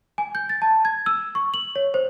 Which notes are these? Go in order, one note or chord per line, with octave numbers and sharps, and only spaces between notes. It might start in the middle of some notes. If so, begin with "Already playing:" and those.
G#5
G6
A6
A5
G#6
E6
C#6
F#7
C#5
C5